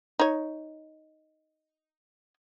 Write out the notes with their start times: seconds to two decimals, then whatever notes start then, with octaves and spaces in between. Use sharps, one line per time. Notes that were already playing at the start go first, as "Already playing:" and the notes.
0.19 D#4 C#5